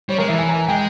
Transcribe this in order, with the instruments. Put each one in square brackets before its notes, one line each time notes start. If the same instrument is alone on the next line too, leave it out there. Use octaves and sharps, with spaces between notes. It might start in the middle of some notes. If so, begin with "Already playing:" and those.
[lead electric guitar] G3 [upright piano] C#5
[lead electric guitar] G#3 [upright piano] A#4
[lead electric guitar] E3 [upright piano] E5
[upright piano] G#5
A#5
G#5
[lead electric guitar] G#3 [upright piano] G5